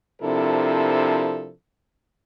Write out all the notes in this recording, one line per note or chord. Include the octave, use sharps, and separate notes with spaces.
C3 F3 D4 E4 A4 A#4